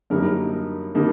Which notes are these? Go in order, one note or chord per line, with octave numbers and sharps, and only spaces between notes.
F#2 D3 G3 A#3 D#4 A#4
D3 G3 A#3 D#4